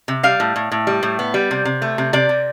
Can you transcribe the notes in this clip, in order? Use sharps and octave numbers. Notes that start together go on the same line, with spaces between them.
C3
G3 F5
A2
A2
A2
G3
A2
B3
G3
C3
C3
A3
C3
C3 D5
C3